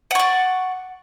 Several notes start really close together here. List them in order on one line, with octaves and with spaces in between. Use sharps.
F#5 C#6 D5